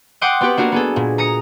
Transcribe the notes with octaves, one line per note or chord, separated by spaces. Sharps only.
F#5 G5 C6 D6 D#6 F#6
B3 C4 F#4 G4 B4
A#3 D4 F#4 A#4
B3 G#4 A4
A#2
A#5 D#6 A#6 C#7